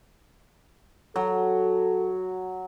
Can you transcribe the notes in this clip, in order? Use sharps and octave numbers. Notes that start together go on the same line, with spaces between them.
F#3 A4